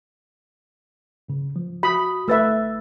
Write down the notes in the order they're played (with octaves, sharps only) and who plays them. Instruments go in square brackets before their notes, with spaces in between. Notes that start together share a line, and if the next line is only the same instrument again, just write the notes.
[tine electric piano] G#2 C#3
F3
[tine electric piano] F#4 D#6 [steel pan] B5
[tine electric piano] G1 E6 A6 [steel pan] A3 B4 E5